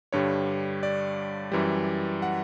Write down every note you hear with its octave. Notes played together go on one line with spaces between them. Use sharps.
G2 D3 G3 C#5
D5
F#2 E3 G3
F#5